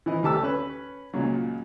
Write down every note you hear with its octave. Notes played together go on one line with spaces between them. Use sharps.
E3 E4 D#5
D2 G4 A5 E6
C#4 B4
C#2 A#2 F#3